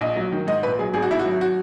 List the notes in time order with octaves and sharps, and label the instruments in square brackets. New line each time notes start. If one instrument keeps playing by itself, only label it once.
[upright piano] A#1 D#5
F#3
D#3
G#2 D#5
A#1 B4
F#3 G#4
G#1 G#4
F#4
G#1 E4
F#4
F#3
F#4